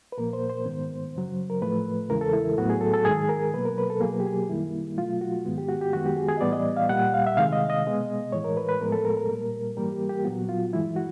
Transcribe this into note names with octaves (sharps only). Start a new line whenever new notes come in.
B4
A#2 F3 A#3 A#4
C5
C5
G#2 D#3 G#3 B3
F#2 C#3 F#3
A#4
A2 F3 A3 B4
E2 C#3 E3 G#3 A#4
A4
E4
A2 F#3 B3 F#4
G#4
A4
A4
G#2 D#3 G#3 G#4
A#4
B2 F#3 A#3 B4
A#4
B4
A4
B2 F#3 A#3 G#4
G4
G#4
F#2 D#3 G3 A#3 E4
B2 F#3 A3 F4
F#4
G#2 D#3 G#3 B3
G4
F#4
G4
F#2 D#3 G#3 B3 F#4
G4
G#4
G#4
D#5
A2 E3 G3 B3 D5
D#5
F5
A#2 G3 A#3 F#5
F5
E5
C3 D#3 G#3 F5
D#5
D#5
B2 G#3 B3
A2 E3 G#3 C#5
A#4
B4
B4
A2 F3 G#3 B3 A#4
A4
A#4
A#4
A#2 G3 A#3
G#2 E3 G3 A#3 A#4
G4
G4
A#2 F#3 B3 F#4
F4
G2 E3 G#3 E4
F#4